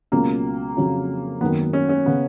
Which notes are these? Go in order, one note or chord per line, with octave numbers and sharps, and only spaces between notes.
C#2 B2 F#3 A#3 C#4 F#4
F2 C#3 F#3 C#4 F4
G#1 F#2 D#3 A#3 B3
C#4
C#4
C#3 B3